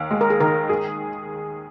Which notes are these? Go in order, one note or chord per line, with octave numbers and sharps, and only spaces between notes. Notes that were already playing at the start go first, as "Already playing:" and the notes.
Already playing: D#2 D#4
G#3
A#4
G#4
D#3 A#4
G#4